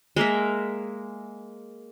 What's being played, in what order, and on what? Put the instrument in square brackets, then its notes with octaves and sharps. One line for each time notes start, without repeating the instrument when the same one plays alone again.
[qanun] G#3 A#3 A#4 E5